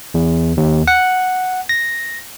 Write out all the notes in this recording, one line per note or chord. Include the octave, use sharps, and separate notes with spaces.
E2
D#2
F#5
A#6